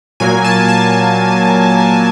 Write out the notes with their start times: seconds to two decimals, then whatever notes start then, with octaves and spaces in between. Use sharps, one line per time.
0.20 A#2 F#3 A#3 G#5
0.44 A5
0.68 A5